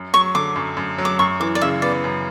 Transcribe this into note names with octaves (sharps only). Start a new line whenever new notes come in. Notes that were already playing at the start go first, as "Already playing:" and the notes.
Already playing: F#2
F#3 C#6
D3 D6
F#2
F#2
F#3
D6
F#2 C#6
E3 D6
D5
C#3 E5
B3 D5
F#2